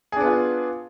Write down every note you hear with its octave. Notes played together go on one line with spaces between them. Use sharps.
B3 D4 F4 G#4